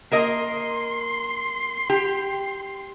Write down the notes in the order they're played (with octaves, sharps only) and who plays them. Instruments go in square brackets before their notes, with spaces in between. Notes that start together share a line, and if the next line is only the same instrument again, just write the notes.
[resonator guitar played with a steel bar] A#3 A#4 D#5 [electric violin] C6 C7
[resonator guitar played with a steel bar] G4